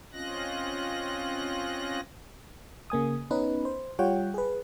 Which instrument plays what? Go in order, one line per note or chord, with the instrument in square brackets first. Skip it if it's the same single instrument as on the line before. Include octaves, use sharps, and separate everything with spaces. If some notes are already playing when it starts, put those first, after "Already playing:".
[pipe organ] C4 C#4 F4 D#5 F#6 A#6
[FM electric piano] C#3 A#3 G#5 D#6
B3 C#4 D#4 B4
C5
G3 F4 C#5 F#5 G5
G#4 B4